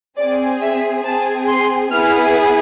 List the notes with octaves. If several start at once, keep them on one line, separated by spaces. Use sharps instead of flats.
C4 G#4 D5
E5
C4 G#4 A5
C6
B3 E4 G#4 F6